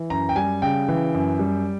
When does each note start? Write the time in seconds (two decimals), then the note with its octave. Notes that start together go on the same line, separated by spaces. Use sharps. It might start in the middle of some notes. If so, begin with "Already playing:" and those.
Already playing: E3
0.10 F#2 A#5
0.29 G5
0.36 G3 G#5
0.62 C#3 G5
0.88 E3
1.15 F#2
1.39 G3